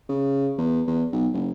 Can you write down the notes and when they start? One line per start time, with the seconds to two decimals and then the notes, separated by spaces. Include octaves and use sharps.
0.09 C#3
0.58 E2
0.87 E2
1.13 B1
1.34 F#1